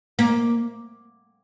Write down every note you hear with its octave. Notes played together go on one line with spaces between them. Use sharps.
A#3